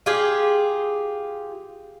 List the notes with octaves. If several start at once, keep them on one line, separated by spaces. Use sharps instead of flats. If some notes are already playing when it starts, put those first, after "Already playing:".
F4 G4 G#4